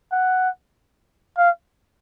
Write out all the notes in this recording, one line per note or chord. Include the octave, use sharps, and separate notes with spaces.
F#5
F5